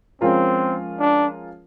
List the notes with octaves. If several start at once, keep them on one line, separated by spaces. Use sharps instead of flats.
F3 G#3 C4 C#4 F4 A#4
D4